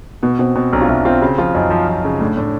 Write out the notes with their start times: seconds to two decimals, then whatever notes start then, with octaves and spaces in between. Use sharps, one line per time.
0.23 B2 B3
0.39 B2 C4
0.55 B2 C4
0.72 B1 D4
0.82 F4
0.88 B1 E4
1.05 C4 F4
1.21 C#3 F#4
1.38 F3 F4
1.54 F#2 D#4
1.70 F3
1.88 F3
2.04 C#3
2.20 A2 D4
2.37 A2 D4